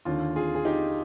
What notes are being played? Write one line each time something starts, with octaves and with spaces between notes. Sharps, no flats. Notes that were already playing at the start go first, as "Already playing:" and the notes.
D#2 D3 F4
F4 G#4
G#4
D#4 G4